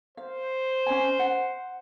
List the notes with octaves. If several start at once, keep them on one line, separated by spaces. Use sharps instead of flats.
C5 F5
C#4 D#5 G#5
F#5